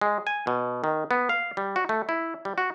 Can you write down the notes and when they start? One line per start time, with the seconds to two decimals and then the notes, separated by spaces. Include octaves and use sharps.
0.01 G#3
0.27 G#5
0.47 B2
0.84 D#3
1.11 B3
1.29 F5
1.57 G3
1.76 F#4
1.89 A3
2.09 E4
2.45 G3
2.58 F#4